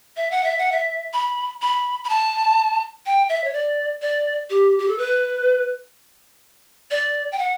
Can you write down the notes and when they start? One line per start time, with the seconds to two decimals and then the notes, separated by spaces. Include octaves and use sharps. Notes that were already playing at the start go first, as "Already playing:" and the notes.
0.17 E5
0.31 F#5
0.44 E5
0.58 F#5
0.72 E5
1.13 B5
1.62 B5
2.04 B5
2.10 A5
3.06 G5
3.29 E5
3.44 C#5
3.53 D5
4.02 D5
4.50 G4
4.79 G4
4.88 A4
4.98 B4
6.91 D5
7.32 G5
7.39 F#5